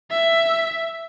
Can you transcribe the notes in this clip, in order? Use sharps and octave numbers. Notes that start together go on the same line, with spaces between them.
E5